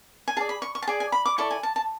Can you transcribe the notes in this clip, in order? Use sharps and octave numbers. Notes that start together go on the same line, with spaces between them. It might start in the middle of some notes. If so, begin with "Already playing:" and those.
G#5
G#4 D5 A5
B5
C#6
C#6
A5
G#4 D5 G#5
G#5
B5
D6
E4 A4 D5 C#6
G#5
A5
A5